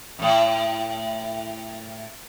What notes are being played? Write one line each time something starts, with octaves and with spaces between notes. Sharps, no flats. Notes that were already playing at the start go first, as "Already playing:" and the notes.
F2 A2